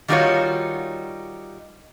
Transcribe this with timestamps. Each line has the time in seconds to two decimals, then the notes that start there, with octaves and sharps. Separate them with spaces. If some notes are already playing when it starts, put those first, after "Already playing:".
0.08 D#3 G3 D#4 F4 F#4 C#5